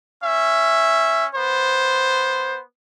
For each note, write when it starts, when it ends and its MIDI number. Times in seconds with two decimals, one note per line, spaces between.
0.23 1.26 61
0.23 1.26 76
1.34 2.61 59
1.34 2.61 72